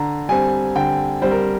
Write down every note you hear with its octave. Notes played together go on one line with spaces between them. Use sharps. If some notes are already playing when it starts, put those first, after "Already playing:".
Already playing: D3 A#5
G3 C4 G#5
D3 G5
G3 C4 C5
A#4